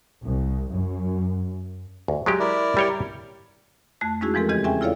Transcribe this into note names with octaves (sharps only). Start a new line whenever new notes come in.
C2
F#2
D2
F#3 G#3 G4
E4 A#4 D5
G3 C#5 G5
F2 A3 A5 F#6
G#3 C#4 D#4 E4 F#4 G#4
E3 F3 G#3 C4 A4 A#4
E2 C#3 E3 G4 D#5 G#6
C4 C#4 G#4 E5 G5 G#5
E4 F4 A4 C#5 D5 F5